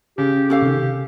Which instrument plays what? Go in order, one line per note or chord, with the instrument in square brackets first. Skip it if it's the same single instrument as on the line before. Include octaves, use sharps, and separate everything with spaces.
[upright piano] C#3 [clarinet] G4
[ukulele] C#4 A4 F5 [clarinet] G4
[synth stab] C3 D#3